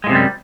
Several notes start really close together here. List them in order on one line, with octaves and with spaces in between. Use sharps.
G#3 A2 C3 F#2 G3